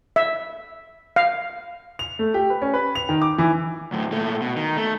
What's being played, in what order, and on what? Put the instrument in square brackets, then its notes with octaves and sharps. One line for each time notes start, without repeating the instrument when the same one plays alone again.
[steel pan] E5
F5
[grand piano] F7
A3
G4
B4
C#4
B4
F7
D#3
D6
E3
[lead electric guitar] D2 A2
A#2 A3
B2
D#3
A3